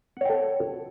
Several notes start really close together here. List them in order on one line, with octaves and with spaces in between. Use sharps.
F#5 C#5 G5 A4